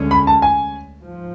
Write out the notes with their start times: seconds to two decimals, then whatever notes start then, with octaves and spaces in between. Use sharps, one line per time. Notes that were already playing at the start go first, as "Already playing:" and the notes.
Already playing: D2 D3 G#3 C#4
0.11 B5
0.27 A5
0.42 G#5
1.05 G#2 F3